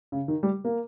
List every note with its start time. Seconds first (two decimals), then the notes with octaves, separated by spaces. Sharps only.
0.12 C#3
0.28 D#3
0.43 G3
0.65 A#3